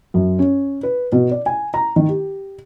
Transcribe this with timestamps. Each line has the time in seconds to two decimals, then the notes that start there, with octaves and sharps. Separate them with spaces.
0.14 F#2
0.39 C#4
0.83 B4
1.12 B2
1.31 D5
1.46 G#5
1.74 A#5
1.96 D#3
2.09 G4